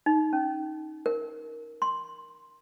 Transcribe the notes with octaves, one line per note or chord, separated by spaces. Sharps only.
D#4
C#4
A#4
C6